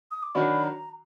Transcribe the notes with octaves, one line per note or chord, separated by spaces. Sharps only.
D#6
D6
D#3 F#3 D4 F#4 B5
A#5